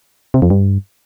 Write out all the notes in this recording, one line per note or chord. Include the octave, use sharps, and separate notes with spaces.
C3
F2
G2